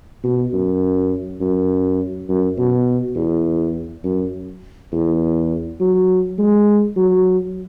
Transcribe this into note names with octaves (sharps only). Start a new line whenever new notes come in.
B2
F#2
F#2
F#2
B2
E2
F#2
E2
F#3
G#3
F#3